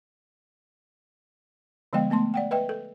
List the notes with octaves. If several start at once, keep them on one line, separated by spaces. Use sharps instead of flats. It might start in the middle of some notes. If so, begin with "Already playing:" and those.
D3 F3 G#3 B3 D#5 G5
A3 B3 A5 C6
D5 F#5 G5
B4 D#5 E5 G5
A4